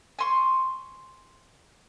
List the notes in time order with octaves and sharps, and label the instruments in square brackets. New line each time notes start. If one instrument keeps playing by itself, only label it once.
[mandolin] G#5 C6 C#6